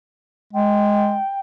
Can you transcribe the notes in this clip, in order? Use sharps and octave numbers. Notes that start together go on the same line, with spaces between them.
G#3 G5